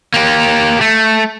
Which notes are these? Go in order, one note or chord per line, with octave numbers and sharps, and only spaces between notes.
A#3 G4
A3